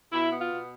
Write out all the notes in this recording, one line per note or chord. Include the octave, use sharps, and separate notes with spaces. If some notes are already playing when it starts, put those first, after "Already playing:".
B2 E4
B3
F4
B2